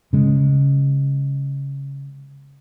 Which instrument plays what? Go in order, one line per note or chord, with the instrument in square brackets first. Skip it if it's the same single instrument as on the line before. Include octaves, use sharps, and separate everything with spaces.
[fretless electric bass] C#3 G#3